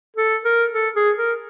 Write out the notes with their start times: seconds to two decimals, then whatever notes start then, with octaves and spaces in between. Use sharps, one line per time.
0.17 A4
0.45 A#4
0.74 A4
0.96 G#4
1.18 A#4